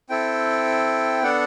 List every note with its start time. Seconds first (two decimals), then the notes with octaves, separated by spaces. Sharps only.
0.10 C4 E4 A4 G5
1.23 B3 D4 A4 F#5